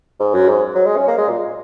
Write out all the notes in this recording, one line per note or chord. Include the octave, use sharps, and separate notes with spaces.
G#2
F#2
G#2
F#3
G#3
C#4
A#3
G#3
A#2